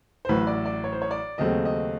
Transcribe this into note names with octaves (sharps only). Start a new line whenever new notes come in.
C5
A1 A2 F#3 B4
D5
D5
C#5
C5
C#5
D5
D#2 C#3 F#3 A3 C4 D#5
D#5